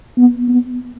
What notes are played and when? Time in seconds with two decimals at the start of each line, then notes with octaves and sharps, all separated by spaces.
0.18 B3
0.49 B3